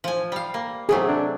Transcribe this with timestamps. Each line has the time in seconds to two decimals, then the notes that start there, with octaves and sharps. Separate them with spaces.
0.04 F3 G#5
0.32 G3 F5
0.54 A#3
0.89 C3 F#3 A3 G#4
1.08 D4